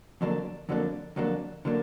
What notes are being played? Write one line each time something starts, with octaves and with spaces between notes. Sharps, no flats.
F2 D3 F#3 A#3 D4
F2 D3 F#3 A#3 D4
F2 D3 F#3 A#3 D4
D3 F#3 A#3 D4